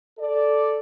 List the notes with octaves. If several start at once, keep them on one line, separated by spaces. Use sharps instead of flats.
A4 D5